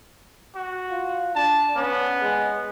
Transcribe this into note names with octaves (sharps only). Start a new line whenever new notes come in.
F#4
F4
D4 A5
B3 C#4
G#3